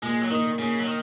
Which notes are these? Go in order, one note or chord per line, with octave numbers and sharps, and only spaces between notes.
A#2 G#3
F#3
D#3 A#3 D#4
A#2 C#3
F#3
D#3